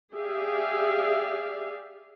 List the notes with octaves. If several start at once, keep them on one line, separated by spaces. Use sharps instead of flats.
G4 G#4 D5 E5 F5